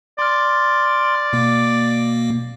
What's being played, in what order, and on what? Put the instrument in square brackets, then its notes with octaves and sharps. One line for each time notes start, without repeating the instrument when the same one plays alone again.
[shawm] D5 [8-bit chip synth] C6 F6
[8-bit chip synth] B2 A#3